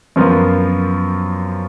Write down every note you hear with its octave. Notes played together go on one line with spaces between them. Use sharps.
F#2 F3 B3 F4 A#4